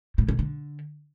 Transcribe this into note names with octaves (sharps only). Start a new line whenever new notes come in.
A2
B2
D3